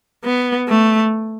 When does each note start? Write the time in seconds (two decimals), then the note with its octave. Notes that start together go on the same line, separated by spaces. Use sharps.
0.25 B3
0.69 A3